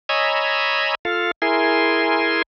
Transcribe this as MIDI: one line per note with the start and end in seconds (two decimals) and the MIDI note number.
0.09 0.95 73
0.09 0.95 75
0.09 0.95 80
0.09 0.95 82
0.09 0.95 83
0.09 0.95 88
1.05 1.31 65
1.05 1.31 69
1.05 1.31 77
1.42 2.42 64
1.42 2.42 68
1.42 2.42 70
1.42 2.42 80
1.42 2.42 84